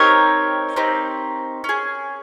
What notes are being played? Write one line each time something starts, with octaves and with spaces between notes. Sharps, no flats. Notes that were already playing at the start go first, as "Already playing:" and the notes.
Already playing: C4 D#4 G4 A#4 C#5
C4 D#4 G4
C#4 G#4